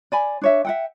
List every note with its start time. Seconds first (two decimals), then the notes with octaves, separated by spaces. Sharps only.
0.12 D5 G#5 B5
0.42 D4 C#5 E5
0.65 E5 F#5 G5